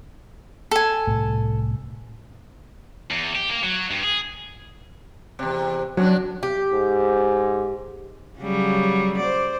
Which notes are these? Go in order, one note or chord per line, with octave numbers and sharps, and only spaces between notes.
A4 G#5
C2 A2 B3
E2
G4
A#3
F#3
G2
G#4
E2 C3
F2 F#3 C#4 D4
G4
G#2
C#3 F#3 G3
C5 D5